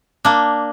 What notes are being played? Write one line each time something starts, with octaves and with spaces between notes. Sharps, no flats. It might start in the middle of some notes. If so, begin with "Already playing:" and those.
A#3 D4